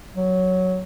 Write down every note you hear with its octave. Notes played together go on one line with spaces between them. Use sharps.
F#3